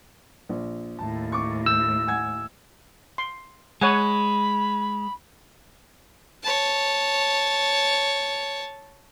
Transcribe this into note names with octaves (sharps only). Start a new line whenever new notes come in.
A#1
D#2 A2 A5
C#6 D6
E6 G6
F#5 G#5 G#6
C6
G#3 C#5 F#5 G#5 B5
C#5 A5